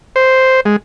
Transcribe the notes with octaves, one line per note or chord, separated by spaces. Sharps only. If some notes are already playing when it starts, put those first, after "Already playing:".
C5
G#3